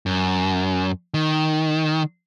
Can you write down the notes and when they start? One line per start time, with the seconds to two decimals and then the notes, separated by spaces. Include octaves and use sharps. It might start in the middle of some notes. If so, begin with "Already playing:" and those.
0.06 F#2
1.14 D#3